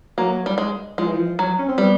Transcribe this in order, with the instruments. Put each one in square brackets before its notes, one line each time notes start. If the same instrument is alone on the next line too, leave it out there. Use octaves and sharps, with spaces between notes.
[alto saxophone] F#3 [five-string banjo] A#3
[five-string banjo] G3
G#3
[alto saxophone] F3 [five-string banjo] G#3
[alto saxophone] E3
F3
[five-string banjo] F#3
[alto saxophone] C#4
C4
[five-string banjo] G3 [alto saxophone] B3